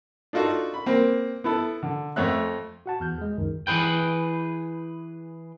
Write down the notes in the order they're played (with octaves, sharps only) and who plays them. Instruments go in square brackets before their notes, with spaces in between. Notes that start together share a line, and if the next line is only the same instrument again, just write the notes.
[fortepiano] D4 D#4 F4 F#4 A4
B5
A#3 C4
B3 E4 A4
D3
F2 A3 A4 C#5 E5 F#6
[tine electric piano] F#4 F#5 A5
E2 F6 G6
G#3 G#4
C#2 F#2 D#3
[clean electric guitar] E3 G#4 B4 G5